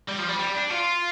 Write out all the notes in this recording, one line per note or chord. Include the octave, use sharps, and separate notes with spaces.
G3
F3
G3
G3
D4
F4